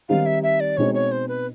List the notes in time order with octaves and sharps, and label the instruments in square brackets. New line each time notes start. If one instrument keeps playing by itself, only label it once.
[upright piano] D#3 G3 C4 D#4 G4 [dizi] F5
[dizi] E5
E5
D5
[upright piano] B2 G#3 C4 D#4 [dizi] C#5
[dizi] C#5
C5
B4